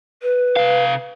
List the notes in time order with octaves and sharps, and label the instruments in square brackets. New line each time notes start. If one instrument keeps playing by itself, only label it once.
[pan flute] B4
[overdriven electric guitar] C3 F5